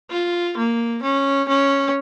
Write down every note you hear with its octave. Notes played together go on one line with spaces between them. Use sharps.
F4
A#3
C#4
C#4